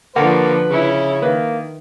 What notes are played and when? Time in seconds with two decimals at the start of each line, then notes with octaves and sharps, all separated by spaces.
0.16 D3 F3 A#3 A4 B4 F#5
0.70 C#3 C#4 E4
1.22 D#3 A#3 B4